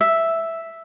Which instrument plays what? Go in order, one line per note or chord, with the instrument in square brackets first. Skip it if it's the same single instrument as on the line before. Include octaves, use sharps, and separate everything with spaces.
[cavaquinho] E5